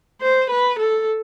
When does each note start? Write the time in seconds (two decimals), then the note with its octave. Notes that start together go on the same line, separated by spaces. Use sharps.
0.21 C5
0.50 B4
0.80 A4